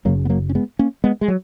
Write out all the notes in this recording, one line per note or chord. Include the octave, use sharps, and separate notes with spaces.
F#1 F#2 C#3 F#3 A#3
B3
F#3 A#3
C#4
G#3 B3
A#3 C#4
G#3 B3
G#3
F#3